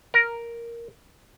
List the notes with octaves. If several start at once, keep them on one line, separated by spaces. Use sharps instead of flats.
A#4